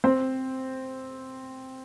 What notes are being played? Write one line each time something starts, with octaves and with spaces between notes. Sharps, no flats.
C4 C5